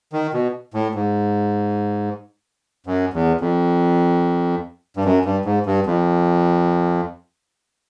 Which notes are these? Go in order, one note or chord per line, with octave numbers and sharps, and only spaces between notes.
D#3
B2
A2
G#2
F#2
E2
F2
G2
F#2
G2
G#2
G2
F2